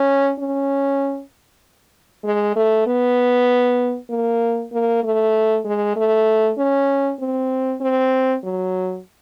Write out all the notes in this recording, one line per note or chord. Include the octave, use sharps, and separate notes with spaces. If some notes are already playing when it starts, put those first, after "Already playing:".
Already playing: C#4
C#4
G#3
A3
B3
A#3
A#3
A3
G#3
A3
C#4
C4
C4
F#3